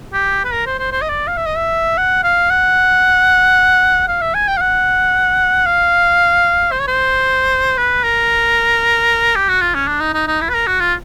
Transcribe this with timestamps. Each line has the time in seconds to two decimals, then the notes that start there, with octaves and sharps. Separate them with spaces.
0.13 G4
0.45 B4
0.53 A#4
0.66 C5
0.79 C5
0.92 C5
1.02 D#5
1.10 D5
1.27 F5
1.37 E5
1.46 D#5
1.56 E5
1.97 F#5
2.24 F5
2.50 F#5
4.08 F5
4.21 E5
4.34 G#5
4.48 G5
4.57 F5
4.61 F#5
5.66 F5
6.72 C5
6.80 C#5
6.88 C5
7.77 B4
8.04 A#4
9.36 G4
9.48 F#4
9.61 F4
9.75 C#4
9.88 D4
10.01 D#4
10.14 D#4
10.27 D#4
10.41 E4
10.49 B4
10.54 A#4
10.67 F#4
10.80 F4